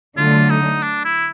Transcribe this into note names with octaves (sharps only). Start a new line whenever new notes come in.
D3 F#3 A3 F4
D#4
D4
E4